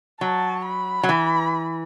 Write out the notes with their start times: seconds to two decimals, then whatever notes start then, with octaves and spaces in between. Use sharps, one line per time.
0.21 F#3 A5
0.65 B5
1.03 F#3
1.09 E3